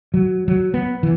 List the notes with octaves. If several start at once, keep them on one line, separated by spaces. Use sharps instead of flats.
F#3
F#3
B3
E3